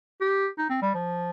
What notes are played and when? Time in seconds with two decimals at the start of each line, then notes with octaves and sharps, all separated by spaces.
0.21 G4
0.58 D#4
0.70 C4
0.82 G3
0.94 F3